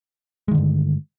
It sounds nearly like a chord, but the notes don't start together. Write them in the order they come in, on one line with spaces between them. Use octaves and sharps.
G#3 D#3 D3 G2